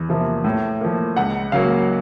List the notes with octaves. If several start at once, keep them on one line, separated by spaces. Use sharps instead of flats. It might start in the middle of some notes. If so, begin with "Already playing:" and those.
Already playing: E2
C3 F3 A#3
A2
F3 A#3
C#2 F#5
C#3 F#3 A#3 F5